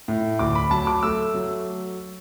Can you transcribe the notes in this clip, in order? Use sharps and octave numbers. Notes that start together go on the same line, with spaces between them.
A2
D2 D6
B5
F#3 A5
D6
A3 E6
F#3